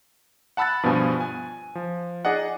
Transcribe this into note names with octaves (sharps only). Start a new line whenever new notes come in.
F#5 A5 B5 E6 F#6 A6
G2 B2 F3 B3 G#5
G#5
F3
D#4 G#4 D5 D#5 F#5